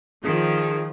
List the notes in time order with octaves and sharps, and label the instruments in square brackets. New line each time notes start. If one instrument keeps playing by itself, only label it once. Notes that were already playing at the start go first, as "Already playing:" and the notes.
[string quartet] D#3 [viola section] F3 [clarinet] G#4